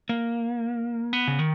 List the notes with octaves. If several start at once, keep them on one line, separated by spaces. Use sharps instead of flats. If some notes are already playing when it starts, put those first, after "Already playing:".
A#3
B3
C#3
D#3